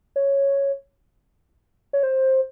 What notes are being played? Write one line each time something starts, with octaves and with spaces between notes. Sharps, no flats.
C#5
C#5
C5